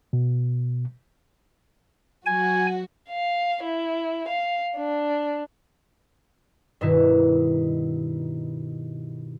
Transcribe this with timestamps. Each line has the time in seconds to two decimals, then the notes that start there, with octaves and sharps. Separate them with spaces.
0.13 B2
2.26 F#3 F#4 G#5
3.09 F5
3.64 E4
4.28 F5
4.76 D4
6.81 G2 B2 D#3 E4